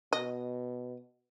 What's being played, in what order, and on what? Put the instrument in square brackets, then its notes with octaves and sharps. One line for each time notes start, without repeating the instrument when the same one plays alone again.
[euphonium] B2 [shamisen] D#5